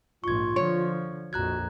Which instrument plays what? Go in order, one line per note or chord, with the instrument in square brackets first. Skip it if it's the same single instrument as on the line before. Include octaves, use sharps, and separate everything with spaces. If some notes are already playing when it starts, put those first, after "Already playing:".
[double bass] A#1 G#2 [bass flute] F4 [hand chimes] C#6 G#6
[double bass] D3 F3 [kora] C#5
[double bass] A#1 F2 [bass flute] F#4 [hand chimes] A#5 F#6 G#6